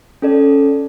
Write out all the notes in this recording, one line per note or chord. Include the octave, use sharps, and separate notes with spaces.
C#4 A4 D5